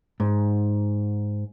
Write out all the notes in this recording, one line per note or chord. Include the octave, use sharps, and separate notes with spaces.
G#2